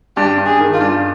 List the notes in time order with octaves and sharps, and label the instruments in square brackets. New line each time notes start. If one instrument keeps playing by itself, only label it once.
[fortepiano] G2 [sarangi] G4
[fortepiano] G2
[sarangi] G#4
[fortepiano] D#3
[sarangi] F4
[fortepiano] G2